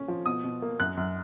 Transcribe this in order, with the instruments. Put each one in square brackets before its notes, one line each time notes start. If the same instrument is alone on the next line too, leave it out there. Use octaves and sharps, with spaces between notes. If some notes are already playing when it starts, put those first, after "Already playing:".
Already playing: [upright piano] A#2 C#4
F3
B2 D#6
B2
A#3
F#2 F#6
F#2